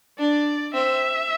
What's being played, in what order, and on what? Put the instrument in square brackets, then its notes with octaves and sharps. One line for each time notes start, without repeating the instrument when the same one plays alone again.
[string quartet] D4 [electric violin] D5
[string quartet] C4 [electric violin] E5